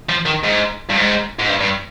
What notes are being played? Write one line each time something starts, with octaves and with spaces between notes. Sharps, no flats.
F3
D#3
G#2
G2
G#2
G#2
G2
G2